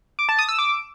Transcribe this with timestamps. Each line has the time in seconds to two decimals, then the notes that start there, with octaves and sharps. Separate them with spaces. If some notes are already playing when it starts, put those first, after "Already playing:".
0.19 D6
0.29 A5
0.39 D#6
0.49 E6
0.59 D6